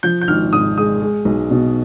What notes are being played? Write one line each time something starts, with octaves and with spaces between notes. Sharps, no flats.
F3 G6
G6
G#1 F6
G#2 D#6
G#3 D#6
G#3
B1
B2